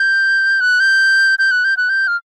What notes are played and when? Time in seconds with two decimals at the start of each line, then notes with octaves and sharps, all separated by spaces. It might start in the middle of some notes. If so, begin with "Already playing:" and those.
Already playing: G6
0.61 F#6
0.80 G6
1.39 G6
1.51 F#6
1.64 G6
1.77 F#6
1.89 G6
2.08 F6